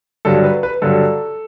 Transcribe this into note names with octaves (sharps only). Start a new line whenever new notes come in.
G2 D3 F#3 A4
B4
B4
G2 D3 F#3 A4